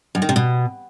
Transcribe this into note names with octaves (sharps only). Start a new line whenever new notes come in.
F#2
D#3
C3
B2